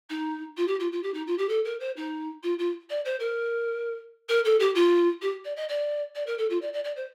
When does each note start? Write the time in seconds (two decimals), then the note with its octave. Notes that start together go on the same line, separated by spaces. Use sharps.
0.09 D#4
0.57 F4
0.67 G4
0.79 F4
0.92 F4
1.03 G4
1.14 D#4
1.27 F4
1.38 G4
1.49 A4
1.64 A#4
1.80 C5
1.96 D#4
2.43 F4
2.59 F4
2.90 D5
3.05 C5
3.19 A#4
4.29 A#4
4.45 A4
4.60 G4
4.75 F4
5.22 G4
5.44 D5
5.56 D#5
5.68 D5
6.15 D5
6.26 A#4
6.38 A4
6.50 F4
6.61 D5
6.73 D5
6.84 D5
6.96 C5